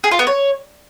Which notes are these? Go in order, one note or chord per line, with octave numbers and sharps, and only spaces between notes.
G#4
F4
B3
C#5